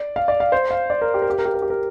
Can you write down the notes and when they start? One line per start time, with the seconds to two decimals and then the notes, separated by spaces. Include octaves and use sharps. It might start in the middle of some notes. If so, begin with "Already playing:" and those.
Already playing: D5
0.16 F5
0.28 D5
0.40 F5
0.52 C5
0.71 F5
0.90 D5
1.02 A#4
1.14 G4
1.22 A#4
1.30 G4
1.39 A#4
1.45 G4
1.54 A#4
1.62 G4
1.70 A#4